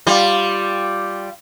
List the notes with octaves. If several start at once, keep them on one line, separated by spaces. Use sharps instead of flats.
G3 F4